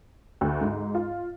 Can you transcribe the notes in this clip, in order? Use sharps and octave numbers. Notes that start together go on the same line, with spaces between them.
D2
G#2
F4